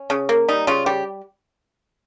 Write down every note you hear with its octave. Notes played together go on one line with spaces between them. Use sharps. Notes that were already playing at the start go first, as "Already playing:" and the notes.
Already playing: C#4
C#3
A#3
G3 D#4
C#3 F4
G3 G4